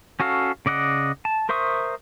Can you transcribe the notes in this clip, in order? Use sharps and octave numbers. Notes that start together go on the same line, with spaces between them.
C#4 F#4 A4 F5
C#3 D5 D#5 F#5
A5
A#4 C5 E5 C#6 D#6